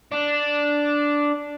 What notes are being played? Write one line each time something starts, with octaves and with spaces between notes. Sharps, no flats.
D4